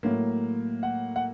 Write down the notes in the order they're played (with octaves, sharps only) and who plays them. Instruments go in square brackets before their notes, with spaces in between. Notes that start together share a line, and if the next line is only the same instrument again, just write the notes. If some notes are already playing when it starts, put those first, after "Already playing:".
[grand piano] A2 F#3 A#3
F#5
F#5